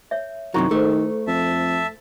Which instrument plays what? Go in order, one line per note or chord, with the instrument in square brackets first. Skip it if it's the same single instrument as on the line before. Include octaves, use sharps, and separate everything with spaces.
[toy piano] C#5 E5
[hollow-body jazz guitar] F#2 C3 F#3 [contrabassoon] D#3 [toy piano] E4 A#5 C#6
[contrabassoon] D#3 [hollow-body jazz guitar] A3 [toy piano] G#4 A4 C5
[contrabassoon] F2 [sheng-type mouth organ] E5 A5